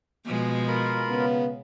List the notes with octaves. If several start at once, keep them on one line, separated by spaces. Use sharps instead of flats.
B2 F3 G#3
F4 A#4 B5
C#3 B3